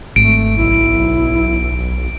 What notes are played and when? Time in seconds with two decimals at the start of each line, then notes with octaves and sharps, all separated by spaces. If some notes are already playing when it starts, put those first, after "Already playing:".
0.16 G#1 A3 D7
0.58 B1 E4